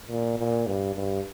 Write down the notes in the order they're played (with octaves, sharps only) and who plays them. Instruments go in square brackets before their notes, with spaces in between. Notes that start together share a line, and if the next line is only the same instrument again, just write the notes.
[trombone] A#2
A#2
G2
G2